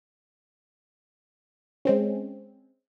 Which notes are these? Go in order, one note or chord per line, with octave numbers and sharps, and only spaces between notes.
G#3 C4 C#4